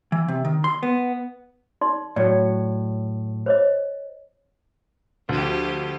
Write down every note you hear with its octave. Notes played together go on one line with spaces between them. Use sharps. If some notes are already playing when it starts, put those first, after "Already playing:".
E3
C3
D#3
C6
B3
D#4 D5 C6
A2 F#3 C#5 D5
C5 C#5 D#5
D2 F3 G4